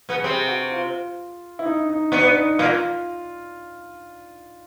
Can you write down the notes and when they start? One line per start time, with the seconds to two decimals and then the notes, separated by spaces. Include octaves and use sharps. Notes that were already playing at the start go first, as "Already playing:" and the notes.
0.09 B2 B3
0.17 G#4
0.24 C3 C4 G4
0.48 F#4
0.72 F4
1.59 E4
1.65 D#4
1.89 D#4
2.12 B2 B3 D4
2.35 D#4
2.58 A#2 A#3 F4